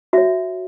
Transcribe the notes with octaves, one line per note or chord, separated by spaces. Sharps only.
F#4 C#5 E5